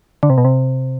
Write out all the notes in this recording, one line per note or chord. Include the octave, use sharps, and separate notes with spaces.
D3
C3
B2
C3